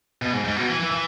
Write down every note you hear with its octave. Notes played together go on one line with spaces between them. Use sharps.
B2
G#2
G#2
B2
E3
E3
E3